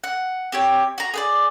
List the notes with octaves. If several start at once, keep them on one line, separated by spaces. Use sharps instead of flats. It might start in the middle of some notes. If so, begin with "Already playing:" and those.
F#5
C4 G4 C#5
F#4 A#5
G#4 B4 D5